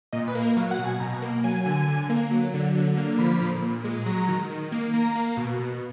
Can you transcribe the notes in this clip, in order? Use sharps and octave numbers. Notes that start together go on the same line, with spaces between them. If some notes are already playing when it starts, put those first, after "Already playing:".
A#2 D#5
B4
A#3
A#4
F#3 F5
F#5
B2
G#5
B2 A#5
A#3
F#3 G#5
D3
D3
A#3
F#3
D3
D3
A#3
F3 B5
A#2
A#2
G#3
F#3 A#5
D#3
D#3
A#3
A#3 A#5
A#3
B2
B2